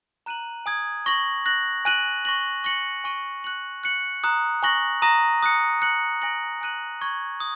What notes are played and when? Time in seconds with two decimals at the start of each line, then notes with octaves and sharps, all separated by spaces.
0.26 A#5 F#6 D#7 F#7
0.66 G#5 D#6 G#6
1.06 C#6 A#6 F#7
1.46 F#6 A#6 F#7
1.85 G#5 F#6 D#7 F#7
2.25 C#6 A#6 F#7
2.64 C#6 A#6 C#7 F#7
3.04 G#5 C#6 A#6 D#7
3.44 F#6 C#7 F#7
3.84 F#6 C#7 F#7
4.24 A#5 D#6 F#6
4.63 G#5 C#6 F#6 A#6 F#7
5.02 A#5 D#6 A#6 D#7
5.43 D#6 F#6 C#7
5.82 F#6 C#7 F#7
6.21 G#5 F#6 A#6 C#7 F#7
6.61 G#5 F#6 D#7 F#7
7.01 C#6 G#6 F#7
7.40 D#6